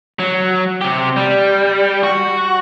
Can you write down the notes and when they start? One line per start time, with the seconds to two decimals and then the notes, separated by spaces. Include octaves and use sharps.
0.20 F#3
0.81 C3 G4
1.17 G3
2.03 F#4